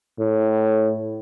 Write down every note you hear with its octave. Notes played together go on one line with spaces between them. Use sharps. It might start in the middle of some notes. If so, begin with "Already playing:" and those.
A2